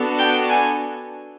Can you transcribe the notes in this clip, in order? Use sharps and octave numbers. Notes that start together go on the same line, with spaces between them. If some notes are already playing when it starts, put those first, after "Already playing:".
Already playing: B3 D4 F#4 A4
G5
G#5